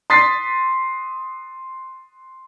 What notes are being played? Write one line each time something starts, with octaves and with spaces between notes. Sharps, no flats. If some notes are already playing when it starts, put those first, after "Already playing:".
C6 D#6 A6 B6 C7